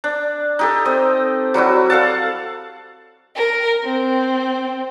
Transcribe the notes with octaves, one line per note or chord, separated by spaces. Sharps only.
D4
D#4 G4 A4
C4 D#5
F#3 G3 E4 F#4
A4 F5 F#5 A5
A#4
C4